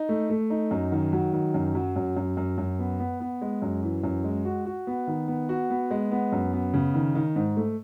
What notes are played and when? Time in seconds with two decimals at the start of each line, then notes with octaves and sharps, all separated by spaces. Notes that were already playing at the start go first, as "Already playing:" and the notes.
Already playing: D#4
0.09 A3
0.30 A3
0.50 D#4
0.71 F#2
0.92 D#3
1.13 F#3
1.33 D#3
1.54 F#2
1.75 F#3
1.96 F#2
2.16 F#2
2.37 F#2
2.58 F#2
2.79 B3
3.00 B3
3.20 B3
3.42 G#3
3.62 F#2
3.83 E3
4.03 F#2
4.24 G#3
4.45 F#4
4.66 F#4
4.87 B3
5.07 D#3
5.28 B3
5.49 F#4
5.70 B3
5.91 G#3
6.11 B3
6.32 F#2
6.53 B3
6.74 C#3
6.94 D#3
7.15 D#3
7.36 G#2
7.57 A3